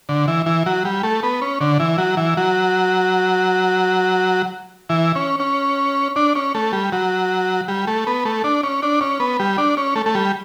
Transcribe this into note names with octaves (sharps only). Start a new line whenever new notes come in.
D3
E3
E3
F#3
G3
A3
B3
C#4
D3
E3
F#3
E3
F#3
E3
C#4
C#4
D4
C#4
A3
G3
F#3
G3
A3
B3
A3
D4
C#4
D4
C#4
B3
G3
D4
C#4
A3
A3
G3